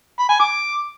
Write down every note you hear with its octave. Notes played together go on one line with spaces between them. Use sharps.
B5
G#5
D6